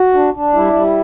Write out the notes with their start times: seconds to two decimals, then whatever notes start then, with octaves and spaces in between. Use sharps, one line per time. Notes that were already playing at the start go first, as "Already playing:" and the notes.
Already playing: F#4
0.14 D4
0.34 D4
0.53 G3 E4
0.73 G3